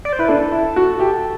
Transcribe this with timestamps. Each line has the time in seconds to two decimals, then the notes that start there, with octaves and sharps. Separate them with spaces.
0.05 D5
0.13 C5
0.19 E4 B4
0.28 D4 A4
0.52 E4
0.76 F#4
0.99 G4